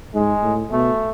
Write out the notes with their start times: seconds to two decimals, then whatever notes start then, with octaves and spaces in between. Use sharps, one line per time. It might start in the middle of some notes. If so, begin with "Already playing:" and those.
0.14 G#2 G#3
0.43 A2
0.71 B2 A3